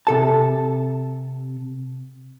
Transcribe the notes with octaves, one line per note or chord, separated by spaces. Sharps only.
C3 A4 A5